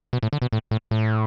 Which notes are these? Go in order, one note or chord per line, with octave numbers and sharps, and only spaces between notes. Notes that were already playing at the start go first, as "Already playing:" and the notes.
B2
A2
D3
B2
A2
A2
A2